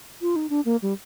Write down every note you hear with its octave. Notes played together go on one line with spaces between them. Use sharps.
F4
D#4
D4
A#3
G3